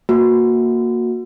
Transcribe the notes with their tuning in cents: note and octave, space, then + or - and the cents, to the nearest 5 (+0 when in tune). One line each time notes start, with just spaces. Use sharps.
A#3 +0 F#4 -20